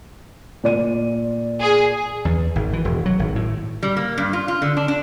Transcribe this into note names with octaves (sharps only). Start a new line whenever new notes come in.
A#2 D5 D#7
G#4
E2
G#1
E3
E1
F#3
G#1
A2
G3
A#3
G2
F4
F4
D3
D4
D4